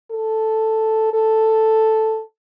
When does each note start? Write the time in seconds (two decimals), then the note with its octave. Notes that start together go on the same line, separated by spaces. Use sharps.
0.12 A4
1.14 A4